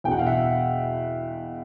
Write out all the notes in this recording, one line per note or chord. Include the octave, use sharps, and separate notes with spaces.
E2 B2 F#5 G5
F5
E5 F#5